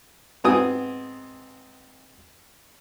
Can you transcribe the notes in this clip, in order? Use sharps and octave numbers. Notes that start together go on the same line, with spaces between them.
G#2 B3 C4 G#5 D#6